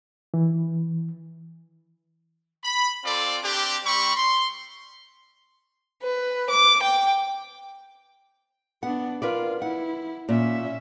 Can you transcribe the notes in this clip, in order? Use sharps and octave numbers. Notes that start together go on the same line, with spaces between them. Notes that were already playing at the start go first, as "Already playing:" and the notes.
E3
B5
C4 F4 A4 D5
C4 D4 G4
G3 C4 B5 C#6
C6
B4
D6
G5
B3 D4 F#5
F4 A#4 B4 D5
E4 F#5
A#2 C#4 E5